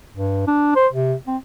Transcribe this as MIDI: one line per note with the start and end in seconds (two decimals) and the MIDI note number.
0.14 0.44 43
0.47 0.71 62
0.75 0.87 72
0.93 1.14 48
1.27 1.37 60